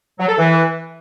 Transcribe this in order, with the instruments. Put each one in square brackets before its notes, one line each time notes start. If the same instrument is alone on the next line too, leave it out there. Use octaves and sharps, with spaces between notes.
[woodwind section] F#3
A4
E3